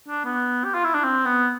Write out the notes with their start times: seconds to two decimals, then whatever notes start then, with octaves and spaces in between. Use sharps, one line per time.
0.08 D4
0.25 B3
0.64 G4
0.74 F4
0.84 E4
0.95 D4
1.04 C4
1.26 B3